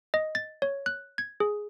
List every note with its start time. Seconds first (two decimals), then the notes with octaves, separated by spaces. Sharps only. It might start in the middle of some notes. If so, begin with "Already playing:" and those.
0.14 D#5
0.35 A6
0.62 C#5
0.86 F#6
1.18 G#6
1.40 G#4